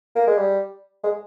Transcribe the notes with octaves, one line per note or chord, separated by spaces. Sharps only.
A#3
G#3
G3
G#3